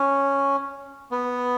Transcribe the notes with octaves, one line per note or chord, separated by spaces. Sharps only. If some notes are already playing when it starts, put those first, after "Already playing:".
Already playing: C#4
B3